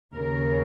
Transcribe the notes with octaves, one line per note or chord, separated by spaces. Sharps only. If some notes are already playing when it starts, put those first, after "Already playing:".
D#2 C#3 A#4